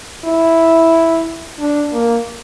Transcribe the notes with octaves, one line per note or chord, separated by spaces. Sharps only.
E4
D4
A#3